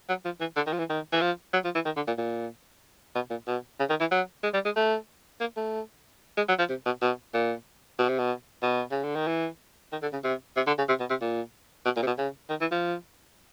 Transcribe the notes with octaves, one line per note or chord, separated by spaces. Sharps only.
F#3
F3
E3
D3
D#3
F3
E3
D#3
E3
F3
F#3
F3
E3
D#3
D3
A#2
A#2
B2
A#2
B2
C#3
D#3
E3
F#3
G#3
G3
G#3
A3
A#3
A3
G#3
F#3
F3
C3
B2
B2
A#2
B2
C3
B2
B2
C#3
D3
D#3
E3
D#3
D3
C#3
C3
C3
D3
C#3
C3
B2
C3
A#2
B2
A#2
C3
B2
C#3
D#3
E3
F3